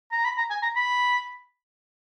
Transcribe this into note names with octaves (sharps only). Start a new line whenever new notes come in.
A#5
B5
A#5
G#5
A#5
B5